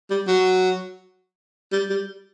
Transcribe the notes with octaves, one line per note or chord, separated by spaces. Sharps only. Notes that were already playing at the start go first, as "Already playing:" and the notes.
G3
F#3
G3
G3